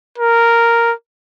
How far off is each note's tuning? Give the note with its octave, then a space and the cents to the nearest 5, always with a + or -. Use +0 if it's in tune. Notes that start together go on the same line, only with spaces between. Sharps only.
A#4 -5